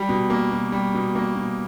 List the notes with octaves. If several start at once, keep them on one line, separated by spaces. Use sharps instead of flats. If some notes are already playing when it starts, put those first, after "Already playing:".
Already playing: G3
B2
A#3
B2
G3
B2
A#3
B2